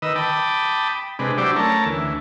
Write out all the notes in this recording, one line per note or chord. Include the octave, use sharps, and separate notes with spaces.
D#3 B4 D#5 E6
G5 A5 B5 D6 D#6
C3 G#3 D4 B4
F#3 D4 E4 G4 C5 D5
A3 C#4 A#4 A5
D2 E3